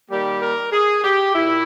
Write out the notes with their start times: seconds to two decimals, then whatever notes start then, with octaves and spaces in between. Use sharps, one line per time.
0.10 D#3 G3 A#3 G4
0.42 A#4
0.73 G#4
1.04 G4
1.34 A#2 E4